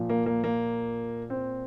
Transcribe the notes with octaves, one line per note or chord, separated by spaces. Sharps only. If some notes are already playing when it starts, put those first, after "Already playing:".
Already playing: A#2 F3
A#3
A#3
A#3
C4